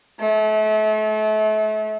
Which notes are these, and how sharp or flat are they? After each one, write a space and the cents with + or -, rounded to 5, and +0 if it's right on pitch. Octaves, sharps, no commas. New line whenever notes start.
A3 -35